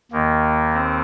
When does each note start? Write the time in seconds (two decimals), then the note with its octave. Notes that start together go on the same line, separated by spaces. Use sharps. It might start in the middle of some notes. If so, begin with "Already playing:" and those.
0.12 D#2 D#3 A#3
0.73 C4